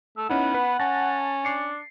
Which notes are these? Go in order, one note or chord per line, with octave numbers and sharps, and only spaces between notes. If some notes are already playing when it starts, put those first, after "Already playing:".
A3 E6
B3 C#4 D#4 E4 F#5
B4 B5
C#4 A5 A6 A#6
D4 C7 C#7